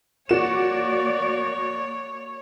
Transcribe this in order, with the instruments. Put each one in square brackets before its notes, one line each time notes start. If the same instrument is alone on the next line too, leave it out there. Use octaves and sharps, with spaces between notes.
[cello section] A#3 D5 [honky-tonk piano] F#4 E7 [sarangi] C#5